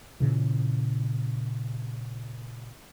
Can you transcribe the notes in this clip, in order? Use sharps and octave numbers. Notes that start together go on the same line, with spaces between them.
A#2 C#3 E3